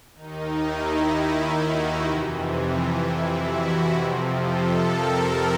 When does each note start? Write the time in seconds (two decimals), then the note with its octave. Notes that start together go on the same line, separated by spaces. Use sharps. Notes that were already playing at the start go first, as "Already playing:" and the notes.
0.15 D#2 D#3 D#4
0.63 E4
1.57 F#4
2.04 F2 C3 E3
2.99 E4
3.46 F#4
3.93 F2 C3 F3
4.40 A4
4.88 A#4